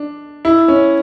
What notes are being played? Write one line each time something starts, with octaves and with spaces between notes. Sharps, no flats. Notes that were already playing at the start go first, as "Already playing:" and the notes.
Already playing: D4
E4
C#4